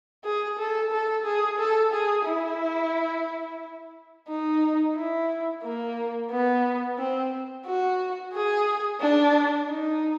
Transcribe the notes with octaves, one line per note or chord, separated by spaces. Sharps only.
G#4
A4
A4
G#4
A4
G#4
E4
D#4
E4
A#3
B3
C4
F#4
G#4
D4
D#4